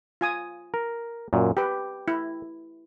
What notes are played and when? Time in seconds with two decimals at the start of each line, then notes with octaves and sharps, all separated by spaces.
0.21 F4 G#5 D#6
0.74 A#4
1.33 F#2 A#2
1.57 G4 B4 G5
2.08 E4